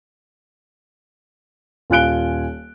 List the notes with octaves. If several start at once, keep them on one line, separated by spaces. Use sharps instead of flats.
D#1 F4 G#5 F#6 D7 G7